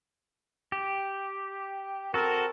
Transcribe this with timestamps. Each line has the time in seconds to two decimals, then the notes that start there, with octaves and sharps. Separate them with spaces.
0.72 G4
2.14 C4 F#4 A4 A#4